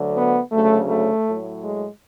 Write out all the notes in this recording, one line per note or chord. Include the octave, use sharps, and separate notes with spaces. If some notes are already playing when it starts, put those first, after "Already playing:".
Already playing: D2 D3 F#3
B3
D2 C#3 F#3 A3
A3
A2 F#3
G#3